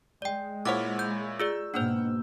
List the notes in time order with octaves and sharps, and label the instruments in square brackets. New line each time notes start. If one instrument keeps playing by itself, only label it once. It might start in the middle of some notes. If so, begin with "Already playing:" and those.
[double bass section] G#3 [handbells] D5 G5
[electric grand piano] A#2 E4 C#5 [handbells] C5 F#5 D6
[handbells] G6
[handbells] F4 G#4 D5 [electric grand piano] E6
[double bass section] G#2 B2 [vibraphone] A#3 [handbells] D4 C5 [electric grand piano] F#5 E6 G6